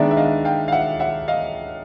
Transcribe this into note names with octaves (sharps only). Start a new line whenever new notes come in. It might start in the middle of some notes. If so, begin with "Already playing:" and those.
Already playing: D#3 G#3 B3 D4 D5 E5
E5
D#5 F5
F5 G5
F5
E5 F#5
E5 F#5
D#5 F5